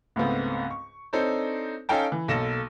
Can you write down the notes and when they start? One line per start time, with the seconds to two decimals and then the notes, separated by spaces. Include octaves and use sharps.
0.16 C#2 G#2 A3 B3 C4
0.70 C#6
1.13 C4 D4 D#4 A4 C5 C#5
1.89 C#4 D#4 A4 F5 G5 A5
2.12 E3
2.28 B1 A#3 A4 A#6 E7